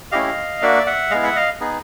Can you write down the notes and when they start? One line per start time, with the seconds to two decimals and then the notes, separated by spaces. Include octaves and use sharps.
0.12 A3 C#4 E4 G4 D#5 F5
0.62 A#3 D4 F#4 D5 E5
0.86 E5 F#5
1.11 G#3 B3 E4 D#5 F5
1.23 E5 F#5
1.36 D#5 F5
1.60 B3 D#4 G#4